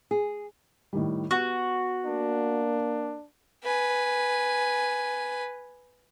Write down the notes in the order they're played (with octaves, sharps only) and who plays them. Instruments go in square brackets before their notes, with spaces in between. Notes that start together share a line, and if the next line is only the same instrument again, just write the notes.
[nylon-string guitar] G#4
[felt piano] A2 D#3 G3
[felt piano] B3 [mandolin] F#4
[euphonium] A#3 [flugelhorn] D4
[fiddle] B4 G#5